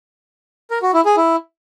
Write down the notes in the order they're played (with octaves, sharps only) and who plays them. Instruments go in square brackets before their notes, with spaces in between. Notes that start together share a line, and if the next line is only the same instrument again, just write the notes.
[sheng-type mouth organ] A#4
F#4
E4
G#4
E4